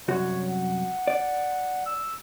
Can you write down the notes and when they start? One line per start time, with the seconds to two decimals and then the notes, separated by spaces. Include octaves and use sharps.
0.08 C2 F#2 F#4 C#5
0.49 F#5
1.07 D5
1.86 E6